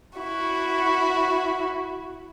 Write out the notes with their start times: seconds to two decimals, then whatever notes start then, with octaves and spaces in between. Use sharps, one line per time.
0.19 E4 F#4